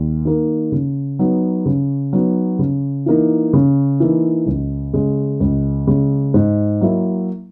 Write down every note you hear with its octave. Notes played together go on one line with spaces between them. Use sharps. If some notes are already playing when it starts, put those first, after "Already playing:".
Already playing: D#2
D#3 A#3 D#4
C#3
F#3 B3 D#4
C#3
F#3 B3 D#4
C#3
E3 A#3 D#4
C#3
E3 A#3 D#4
C#2
C#3 G#3
C#2
C#3 G#3
G#2
F#3 A#3 E4